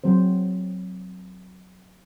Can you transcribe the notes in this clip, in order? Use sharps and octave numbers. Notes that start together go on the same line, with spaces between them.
F#3 C4 C5